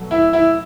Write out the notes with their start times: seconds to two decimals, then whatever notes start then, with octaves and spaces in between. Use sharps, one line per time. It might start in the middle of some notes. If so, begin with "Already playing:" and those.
Already playing: B2 F#3 A3
0.11 E4
0.33 E4